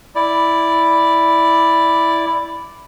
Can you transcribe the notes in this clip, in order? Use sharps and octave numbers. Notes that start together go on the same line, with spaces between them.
E4 D5